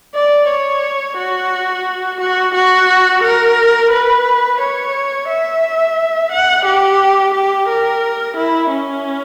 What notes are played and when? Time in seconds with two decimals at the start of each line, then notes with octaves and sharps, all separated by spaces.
0.15 D5
0.49 C#5
1.18 F#4
2.21 F#4
2.55 F#4
3.23 A#4
3.92 B4
4.60 C#5
5.29 E5
6.32 F#5
6.65 G4
7.34 G4
7.69 A#4
8.37 E4
8.72 C#4